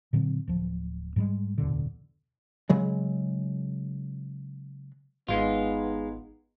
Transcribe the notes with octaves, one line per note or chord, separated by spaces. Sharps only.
A#2 D3 F#3 C4
D1 F3
G#2 G3 G#3
D1 E2 B2 D3
C#3 F#3 G#3
G#1 G#3 B3 D#4 F4